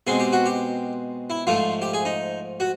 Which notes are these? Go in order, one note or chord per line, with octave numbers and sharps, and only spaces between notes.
B2 G#3 C4 G#4
G4
F#4
G4
E4
G#2 F3 A3 F4
G4
G#4
D#4
F#4